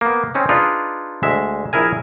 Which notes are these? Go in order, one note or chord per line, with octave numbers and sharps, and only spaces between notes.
A#3 B3
C4 C#4 D#4
D4 D#4 F4 G#4 B4 D5
D2 G#3 E5
A#1 E4 G#4 A#4 G#5